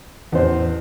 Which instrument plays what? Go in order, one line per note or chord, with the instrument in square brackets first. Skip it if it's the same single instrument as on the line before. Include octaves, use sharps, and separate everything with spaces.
[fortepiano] A1 C5 [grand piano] E2